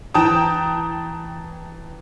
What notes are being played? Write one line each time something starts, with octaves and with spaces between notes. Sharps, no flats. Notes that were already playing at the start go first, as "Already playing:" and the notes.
E3 G5 A5 A#5 D#6